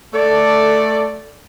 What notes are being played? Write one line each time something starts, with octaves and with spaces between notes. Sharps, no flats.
A3 A4 D5